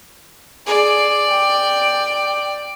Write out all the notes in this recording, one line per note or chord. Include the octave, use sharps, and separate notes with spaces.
G#4 D5
G5